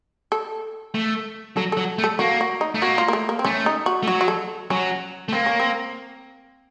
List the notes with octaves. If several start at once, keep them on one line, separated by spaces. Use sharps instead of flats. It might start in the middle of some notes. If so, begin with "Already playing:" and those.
A4
A3
F#3 A4
F#3 A4
A3
A4
A#3 F#4
F#4
D#4
A3
A#3 F#4
F4
A#3
A3
A#3
C4
A3 C#4
D#4
F#4
A3
F#3 F#4
F#4
A4
F#3 C#4
A3
A#3 C4
C#4
C4